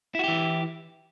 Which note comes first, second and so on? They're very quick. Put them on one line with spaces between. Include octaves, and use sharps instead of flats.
E4 F#4 G4 E3